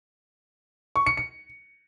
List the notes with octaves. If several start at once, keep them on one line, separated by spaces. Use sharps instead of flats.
C#6
C#7
C#7